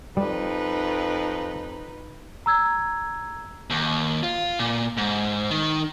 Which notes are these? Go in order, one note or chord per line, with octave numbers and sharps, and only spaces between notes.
F2 G3 D#4 B4
A#5 E6 G#6
D#2
F4
A#2
G#2
D#3